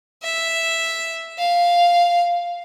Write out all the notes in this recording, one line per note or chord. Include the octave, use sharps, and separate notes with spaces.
E5
F5